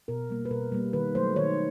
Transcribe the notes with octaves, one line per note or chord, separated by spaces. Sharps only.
B2 A#4
G3 A#3
B4
B2 A#4
G3 A#3
D#3 B4
F#3 A3 C5
D#3 C#5